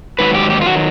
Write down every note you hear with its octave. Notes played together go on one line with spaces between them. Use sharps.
G#2 D#3 F#3 B4
G4
G4
F4
D#3 F#3 F#4